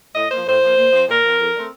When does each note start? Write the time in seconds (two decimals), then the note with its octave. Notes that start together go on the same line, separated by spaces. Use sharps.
0.15 A2 D#5
0.31 F3 A#3 C5
0.47 A2 C5
0.62 F3 A#3
0.77 A#2
0.93 F3 C4
1.08 A#2 A#4
1.25 F3 C4
1.39 F2
1.55 D3 A3 C4